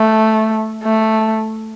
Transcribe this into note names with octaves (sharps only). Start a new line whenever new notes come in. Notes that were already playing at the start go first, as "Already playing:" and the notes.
Already playing: A3
A3